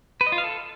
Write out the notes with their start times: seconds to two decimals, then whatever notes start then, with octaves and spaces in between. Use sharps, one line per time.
0.21 B4
0.27 D#5
0.32 F4
0.38 F5
0.44 A4